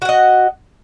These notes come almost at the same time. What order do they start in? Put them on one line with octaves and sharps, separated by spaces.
F#4 F#5 D#5